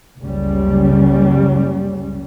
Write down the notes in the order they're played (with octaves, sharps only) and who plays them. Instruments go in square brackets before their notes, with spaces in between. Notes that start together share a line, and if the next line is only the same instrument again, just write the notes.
[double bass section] F#1 C#2 C#3 G3 C#4